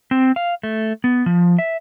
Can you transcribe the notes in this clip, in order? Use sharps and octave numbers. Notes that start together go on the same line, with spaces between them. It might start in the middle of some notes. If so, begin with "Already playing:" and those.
C4
F5
A3
B3
F3
E5